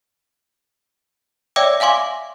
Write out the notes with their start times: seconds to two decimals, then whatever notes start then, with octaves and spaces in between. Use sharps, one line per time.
1.56 C#5 D5 E5 G5 D6 E6
1.80 E5 F5 G#5 C6 D6